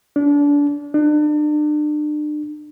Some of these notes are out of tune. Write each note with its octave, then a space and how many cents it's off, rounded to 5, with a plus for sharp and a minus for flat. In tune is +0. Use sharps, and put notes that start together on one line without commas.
D4 -30
D4 +35